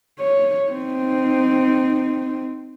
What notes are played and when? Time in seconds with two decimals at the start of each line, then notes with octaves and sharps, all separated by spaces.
0.19 C#5
0.71 C4 D#4